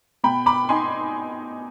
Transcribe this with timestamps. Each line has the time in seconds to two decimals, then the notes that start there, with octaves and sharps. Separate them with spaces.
0.24 B2 G5 B5
0.46 B5 D6
0.69 D#4 G#5 C6